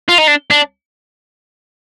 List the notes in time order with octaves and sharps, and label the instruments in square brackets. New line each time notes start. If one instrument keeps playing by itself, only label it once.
[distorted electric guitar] F4
D#4
D4
D4